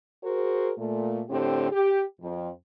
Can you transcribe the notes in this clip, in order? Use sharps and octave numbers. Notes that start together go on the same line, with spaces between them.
F#4 G#4 A#4 C5
A#2 A3
A2 D3 C4 G4
G4
F2